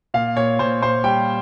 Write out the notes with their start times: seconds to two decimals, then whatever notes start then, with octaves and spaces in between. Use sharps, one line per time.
0.14 A#2 F5
0.36 A#2 C#5
0.59 A#2 C5
0.82 A#2 C5
1.04 G3 G5